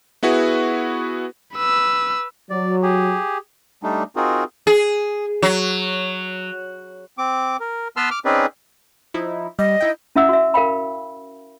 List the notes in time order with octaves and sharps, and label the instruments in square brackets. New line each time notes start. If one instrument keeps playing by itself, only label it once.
[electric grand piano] B3 E4 F#4 G#4 B4
[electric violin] B4 E6
[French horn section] F#3 [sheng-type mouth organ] D5
[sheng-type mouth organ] G4 G#4
[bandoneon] G3 A3 D4 D#4
C4 D#4 F4 F#4 G#4 A#4
[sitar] G#4
F#3
[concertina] C4 D6
A#4
B3 B4 A5 C6 E6 F6
D6 F6
C4 C#4 D#4 G#4 B4 D5
[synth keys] F3 D#4 E4
[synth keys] G3 [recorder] D#5
[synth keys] D#4 E4 G5
[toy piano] C#4 E4 E5 F#5 E6
F#4 E5
A#4 F5 G5 B5